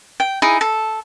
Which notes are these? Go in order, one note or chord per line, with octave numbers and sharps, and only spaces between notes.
G5
D#4 E4 G#4
A4